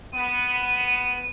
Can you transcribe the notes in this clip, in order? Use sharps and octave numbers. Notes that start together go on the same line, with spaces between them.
B3 D#7